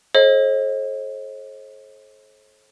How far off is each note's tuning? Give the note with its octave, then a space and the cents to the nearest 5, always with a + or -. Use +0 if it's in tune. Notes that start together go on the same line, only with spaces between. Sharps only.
A4 -35 C5 +45 D#5 +20